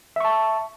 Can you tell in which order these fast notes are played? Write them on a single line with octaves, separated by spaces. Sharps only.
E5 C#6 A5